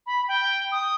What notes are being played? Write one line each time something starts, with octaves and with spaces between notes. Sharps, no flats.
B5
G5
D#6